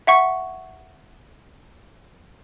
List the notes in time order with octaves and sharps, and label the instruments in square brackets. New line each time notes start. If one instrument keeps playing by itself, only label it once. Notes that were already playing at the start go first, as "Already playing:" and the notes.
[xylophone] E5 F#5 C#6